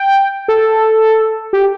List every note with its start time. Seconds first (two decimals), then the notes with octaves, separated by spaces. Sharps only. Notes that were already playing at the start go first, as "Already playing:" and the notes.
Already playing: G5
0.48 A4
1.53 G4